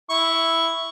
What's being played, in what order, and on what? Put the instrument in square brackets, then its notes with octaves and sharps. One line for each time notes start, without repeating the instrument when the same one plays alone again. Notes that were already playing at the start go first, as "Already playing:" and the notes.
[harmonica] E4 C#6